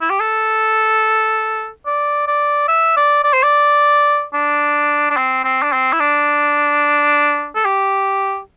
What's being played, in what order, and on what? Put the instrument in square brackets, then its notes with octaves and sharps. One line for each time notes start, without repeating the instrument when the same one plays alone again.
[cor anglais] E4
G4
A4
D5
D5
E5
D5
D5
C5
D5
D4
D4
C4
C4
D4
C4
E4
D4
A4
G4